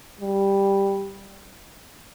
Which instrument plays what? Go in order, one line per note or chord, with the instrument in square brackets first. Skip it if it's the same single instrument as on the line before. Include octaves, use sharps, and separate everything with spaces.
[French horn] G3